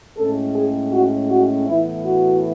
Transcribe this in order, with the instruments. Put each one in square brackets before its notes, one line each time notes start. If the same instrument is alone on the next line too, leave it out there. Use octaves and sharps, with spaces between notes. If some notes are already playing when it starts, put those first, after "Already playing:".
[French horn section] A2 G#3 C#4 A4
G#4
F#4
F#4
A2 E3 B3 E4
F#4